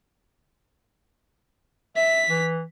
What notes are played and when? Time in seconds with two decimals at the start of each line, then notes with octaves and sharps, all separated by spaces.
1.96 E5 B6
2.29 E3